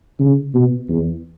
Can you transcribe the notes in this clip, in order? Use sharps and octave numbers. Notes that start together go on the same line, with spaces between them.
C#3
B2
E2